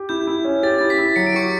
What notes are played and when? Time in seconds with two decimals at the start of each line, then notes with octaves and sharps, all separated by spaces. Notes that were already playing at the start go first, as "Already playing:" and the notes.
Already playing: G4
0.09 E4 G6
0.27 E4
0.45 C#4
0.63 G4 A6
0.78 E4 A6
0.90 B6
0.99 E4
1.16 F#3 C#7
1.27 D7
1.34 G4 C#6 C#7